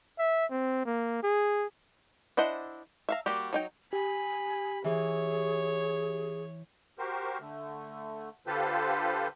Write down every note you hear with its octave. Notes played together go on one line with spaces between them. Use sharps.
E5
C4
A#3
G#4
D4 E4 C5 D#5 F#5
E5 F5 A#5
G3 A#3 F#4 G4
F#3 D#4 G5
G4 G#5 B5
E3 G#4 C#5
F#4 G4 A#4 C5
D3 A3
D3 F4 G4 A4 B4 C5